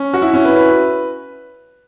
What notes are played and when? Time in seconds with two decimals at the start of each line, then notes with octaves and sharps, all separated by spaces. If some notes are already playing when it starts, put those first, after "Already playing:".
Already playing: C#4
0.13 F#4
0.22 E4
0.34 C#4
0.45 B4
0.56 B4